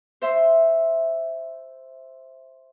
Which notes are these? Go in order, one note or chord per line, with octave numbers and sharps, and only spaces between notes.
C5 E5 C6